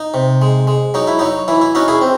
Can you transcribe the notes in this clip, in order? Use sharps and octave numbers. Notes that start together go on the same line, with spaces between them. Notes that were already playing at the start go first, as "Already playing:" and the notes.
Already playing: D#4
C3
G#3
G#3
F#3 D#4
E4
F#3 D#4
E3 E4
E4
C#4 D#4 F#4
E4 G#4
C4